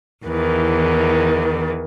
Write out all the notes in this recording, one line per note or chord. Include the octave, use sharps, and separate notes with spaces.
E2 D#3 E3